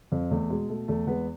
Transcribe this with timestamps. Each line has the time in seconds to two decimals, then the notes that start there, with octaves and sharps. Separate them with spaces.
0.12 F2
0.31 E2 A3
0.50 B2 G#3
0.69 B2 A3
0.88 E2 A3
1.07 E2 G#3 B3